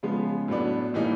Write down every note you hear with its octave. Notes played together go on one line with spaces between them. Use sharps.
C#3 F3 G#3 B3
A2 F#3 B3 D4
A2 E3 G3 A#3 D#4